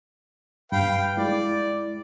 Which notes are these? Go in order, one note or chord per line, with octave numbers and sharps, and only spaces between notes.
G2 B4 F5 G5
G#3 E4 D5